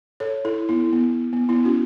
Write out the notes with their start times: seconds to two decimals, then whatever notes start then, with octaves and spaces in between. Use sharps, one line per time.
0.20 A4 C#5
0.45 E4 A4
0.69 B3 E4
0.93 B3
1.33 B3
1.49 B3 E4
1.65 C#4 F#4